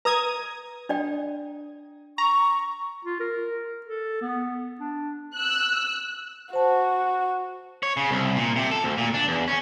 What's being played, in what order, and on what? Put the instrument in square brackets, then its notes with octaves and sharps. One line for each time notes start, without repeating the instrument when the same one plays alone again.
[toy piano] B4 [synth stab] A#5 D#6 G#6
[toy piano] D4 D5 G5
[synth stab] A#5 [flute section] C#6
[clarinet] F4
A#4
A4
B3
D4
[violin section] E6 F#6
[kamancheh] F#4 [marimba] C5 A5
[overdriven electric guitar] C#5
C#3
C2
A#2
C3
A4
D2
A#2
D4
E2
C#4